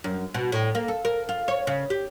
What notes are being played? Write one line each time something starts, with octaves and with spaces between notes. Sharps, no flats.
F#2
B2
A2
A#3
A4
A#4
F4
C#5
C#3
G4